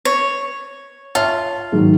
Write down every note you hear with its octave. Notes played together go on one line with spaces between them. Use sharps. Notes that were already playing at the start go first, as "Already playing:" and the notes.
C#5
F4 C#5 E5 A5
G#2 D#3 F#3